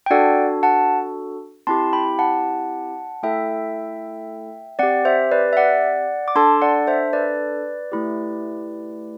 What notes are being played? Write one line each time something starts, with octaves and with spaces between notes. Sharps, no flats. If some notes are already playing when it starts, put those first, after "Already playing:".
G5
D4 F#4 A4 D5 F#5
F#5 A5
C4 E4 G4 A5 C6
G5 B5
F#5 A5
A3 E4 A4 E5 G5
C4 G4 D5 F#5
C5 E5
B4 D5
E5
D5 F#5
D6
D4 A4 A5 C6
D5 F#5
C5 E5
B4 D5
A3 E4 G4